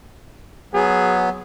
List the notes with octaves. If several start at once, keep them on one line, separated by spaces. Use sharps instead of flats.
F#3 B3 G#4